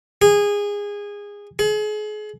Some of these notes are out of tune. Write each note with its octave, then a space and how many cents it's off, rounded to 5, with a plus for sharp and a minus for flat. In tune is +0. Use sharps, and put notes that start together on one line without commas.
G#4 -20
G#4 +35